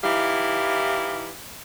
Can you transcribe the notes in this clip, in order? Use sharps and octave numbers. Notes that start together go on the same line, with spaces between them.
E3 D#4 E4 G4 F5